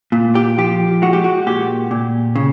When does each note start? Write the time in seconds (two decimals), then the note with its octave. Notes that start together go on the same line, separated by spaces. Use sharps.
0.12 A#2
0.35 G4
0.58 F3 G4
1.02 G#3 F#4
1.13 G4
1.24 F#4
1.46 A#2 G4
1.91 A#2
2.36 C#3